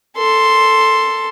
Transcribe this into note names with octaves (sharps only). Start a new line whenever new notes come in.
A4 C6